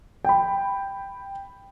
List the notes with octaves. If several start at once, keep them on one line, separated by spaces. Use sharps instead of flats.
G5 B5